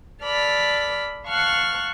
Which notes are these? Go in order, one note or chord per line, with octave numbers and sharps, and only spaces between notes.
A4 D5 B5 F6
F5 F#5 A5 C#6 F6 F#6